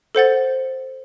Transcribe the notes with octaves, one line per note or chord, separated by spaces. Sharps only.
A4 C5 F#5 A6